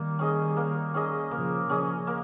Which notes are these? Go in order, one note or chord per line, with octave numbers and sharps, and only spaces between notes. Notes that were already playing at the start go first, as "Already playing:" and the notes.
Already playing: D#3 G3 A#3
C#4 G#4 D#5
A#3
C#4 G#4 D#5
C#3 F3 A#3
C#3 F3 C#4 G#4 D#5
A#3